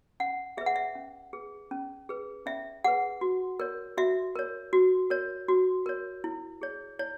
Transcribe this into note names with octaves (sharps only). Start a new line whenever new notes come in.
C#4 F#5
G#4 B4 E5
F#5
E5
C#4
G#4 B4
C#4
G#4 B4
C#4 E5
G#4 B4 F#5
F#4
A#4 C#5
F#4 E5
A#4 C#5
F#4
A#4 C#5
F#4
A#4 C#5
E4
G#4 C#5
E4 C#5